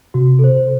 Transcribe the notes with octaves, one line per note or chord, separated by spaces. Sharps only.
C3 F#4
A4 C5